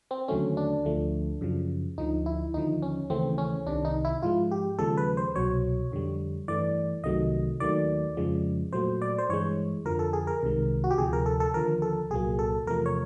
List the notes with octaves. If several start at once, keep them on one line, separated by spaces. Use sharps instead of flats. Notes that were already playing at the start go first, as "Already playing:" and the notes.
C4
D#2 D3 F#3 A3 C#4
D4
D2 D3 F3 A3
F#2 C#3 F3
D2 D3 F3 D#4
E4
D#2 D3 F3 D#4
C#4
D#2 C#3 E3 A3 C4
C#4
C2 C3 D#3 D4
D#4
E4
G#2 F3 G#3 F4
G4
D#2 C#3 F3 G#3 A4
B4
C5
C2 B2 F#3 C#5
F2 D3 G3
G2 E3 A3 D5
C2 C3 D#3 F#3 A3 D#5
D#2 D#3 F#3 A3 D5
F2 C#3 F3 G#3
A#2 F#3 A3 C5
D5
C5
G2 E3 G#3 C#5
F2 D3 F3 A#4
A4
G#4
A#4
C2 C3 D#3 G#3
F#4
G4
D2 C3 F3 G#4
A#4
A4
A4
D#2 D3 F3 A#4
A4
C2 A#2 F#3 A#3 G#4
A4
E2 C3 F3 A3 A#4
C#5